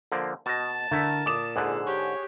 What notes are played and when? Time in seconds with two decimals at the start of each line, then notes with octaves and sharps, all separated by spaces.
0.12 D3 F3 A#3
0.46 B2 D#5 A5
0.91 D3 A3 E4 A#4
1.26 A#2 D6 D#6 E7
1.56 G#2 D3 G#4 F#6
1.87 G4 C#5